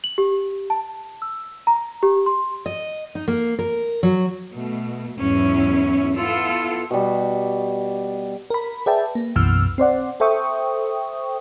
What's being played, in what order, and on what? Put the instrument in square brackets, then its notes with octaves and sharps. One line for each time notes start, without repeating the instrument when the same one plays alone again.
[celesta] F#7
G4
A5
E6
A#5
G4
C6
[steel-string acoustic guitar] D#5
D#4
A#3
A#4
F#3
[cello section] B2 A3
E2 G#2 F#3 C#4 E4
B3 E4 F4 A4
[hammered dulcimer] B2 G3
[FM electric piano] A#4 B5
G#4 B4 D5 E5 G5 A5
A#3
B1 F#2 B2 E3 E6 F6
C4 C5 D5 F#5
A4 C5 E5 G5 C#6 D#6